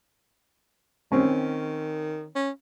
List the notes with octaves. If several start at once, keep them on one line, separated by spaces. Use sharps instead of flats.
D#3 C4 C#4
C#4